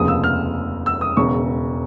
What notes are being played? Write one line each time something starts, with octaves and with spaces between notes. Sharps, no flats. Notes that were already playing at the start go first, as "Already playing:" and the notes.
Already playing: F1 D#2 C#3 F3 D#6
E6
F6
E6
D#6
E1 E2 C#3 C#6